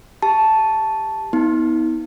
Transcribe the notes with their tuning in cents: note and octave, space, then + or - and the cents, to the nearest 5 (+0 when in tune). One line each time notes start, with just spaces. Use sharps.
G4 +15 A5 -5
B3 +0 D#4 +40